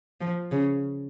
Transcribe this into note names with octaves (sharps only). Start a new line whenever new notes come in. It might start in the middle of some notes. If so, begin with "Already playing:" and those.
F3
C#3